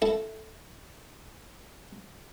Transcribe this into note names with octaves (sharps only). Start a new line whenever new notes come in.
E4 A4